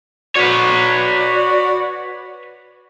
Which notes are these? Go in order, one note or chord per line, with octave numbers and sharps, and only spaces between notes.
F#4 B4 C#5 D5